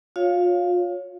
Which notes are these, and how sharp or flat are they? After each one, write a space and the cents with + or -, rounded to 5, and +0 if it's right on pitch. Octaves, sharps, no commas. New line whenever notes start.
F4 +35 C#5 +0 F5 +0